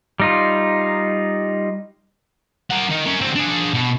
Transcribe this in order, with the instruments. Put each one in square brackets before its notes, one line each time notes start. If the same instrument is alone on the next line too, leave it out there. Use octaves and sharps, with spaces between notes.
[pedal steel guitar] G3 D#4 F4
[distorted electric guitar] A#4 F#5
D#3 D#4
C#4 A#4
D3 C4
D4 G#4
B2